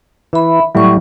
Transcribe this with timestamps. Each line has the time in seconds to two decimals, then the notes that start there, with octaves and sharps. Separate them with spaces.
0.33 E3 E5 B5
0.75 A2 F#3 G3 E4 C#6